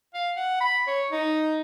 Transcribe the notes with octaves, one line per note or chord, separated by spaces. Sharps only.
F5
F#5
B5
C#5
D#4